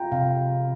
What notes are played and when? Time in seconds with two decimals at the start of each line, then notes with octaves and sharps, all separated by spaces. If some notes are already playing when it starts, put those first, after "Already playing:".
Already playing: F4 G5 A#5
0.12 C3 F5